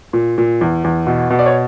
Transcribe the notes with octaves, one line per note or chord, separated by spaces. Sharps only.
A#2
A#2
E2
E2
B2
B2
D5
C#5